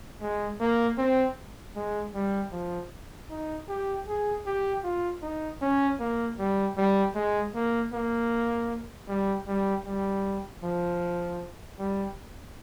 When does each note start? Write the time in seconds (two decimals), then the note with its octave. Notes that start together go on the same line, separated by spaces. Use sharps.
0.21 G#3
0.60 A#3
0.98 C4
1.76 G#3
2.15 G3
2.52 F3
3.30 D#4
3.68 G4
4.08 G#4
4.46 G4
4.84 F4
5.22 D#4
5.61 C#4
6.00 A#3
6.39 G3
6.77 G3
7.15 G#3
7.55 A#3
7.93 A#3
9.08 G3
9.47 G3
9.86 G3
10.63 F3
11.79 G3